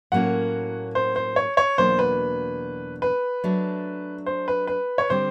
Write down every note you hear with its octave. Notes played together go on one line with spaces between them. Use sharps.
A2 F#3 A#3 C#4 F#4 F#5
C5
C5
C#5
C#5
E2 B2 F#3 A#3 D4 C5
B4
B4
F#3 A3 D4
C5
B4
B4
C#5
D3 G3 C4 C5